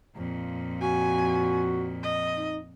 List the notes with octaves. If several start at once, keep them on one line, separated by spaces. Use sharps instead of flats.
F2 A#2
F#4 G#5
D#5
D#4